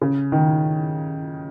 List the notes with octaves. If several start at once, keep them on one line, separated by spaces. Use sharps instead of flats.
C#3
D#3